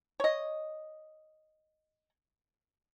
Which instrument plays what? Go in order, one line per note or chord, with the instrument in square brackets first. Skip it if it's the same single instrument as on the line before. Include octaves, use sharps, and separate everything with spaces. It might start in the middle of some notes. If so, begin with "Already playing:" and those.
[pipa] C#5 D#5